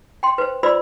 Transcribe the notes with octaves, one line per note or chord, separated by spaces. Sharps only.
G5 C6
B4 C5
F4 B4 C5 D5 B5 E6